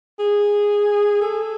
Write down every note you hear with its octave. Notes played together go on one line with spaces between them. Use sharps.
G#4
A4